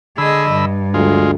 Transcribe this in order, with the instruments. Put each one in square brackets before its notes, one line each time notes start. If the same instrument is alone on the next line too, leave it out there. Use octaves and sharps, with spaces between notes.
[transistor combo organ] D3 B5 E6 [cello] G#4 D#5
[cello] G2
[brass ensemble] D2 [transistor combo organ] G#3 F4